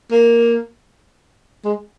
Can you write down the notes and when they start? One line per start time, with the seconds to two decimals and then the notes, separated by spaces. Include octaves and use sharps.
0.11 A#3
1.65 G#3